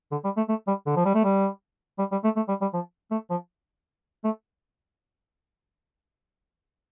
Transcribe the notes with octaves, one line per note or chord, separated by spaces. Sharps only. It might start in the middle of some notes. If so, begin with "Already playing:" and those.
D3
G3
A3
A3
G3
D3
F3
G3
A3
G3
G3
G3
A3
A3
G3
G3
F3
A3
F3
A3